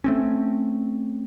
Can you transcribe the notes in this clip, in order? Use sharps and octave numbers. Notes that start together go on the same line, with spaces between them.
A3 C4 C#4